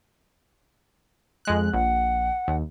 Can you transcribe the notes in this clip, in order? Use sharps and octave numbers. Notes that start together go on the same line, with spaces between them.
F2 G#3 F#6
A#1 F#5
D#2